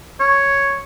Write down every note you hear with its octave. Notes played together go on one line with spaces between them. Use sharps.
C#5